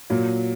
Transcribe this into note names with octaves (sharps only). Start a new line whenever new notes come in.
A#2 F#3